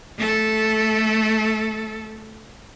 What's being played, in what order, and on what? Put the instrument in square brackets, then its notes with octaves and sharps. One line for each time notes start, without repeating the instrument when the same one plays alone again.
[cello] A3 A4